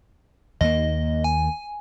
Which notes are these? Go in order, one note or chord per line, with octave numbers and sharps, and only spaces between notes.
D#2 A#3 D#5
G#5